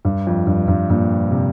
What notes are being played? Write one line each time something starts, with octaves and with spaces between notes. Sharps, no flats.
G2
F2
G2
G2
G2 A#2
C3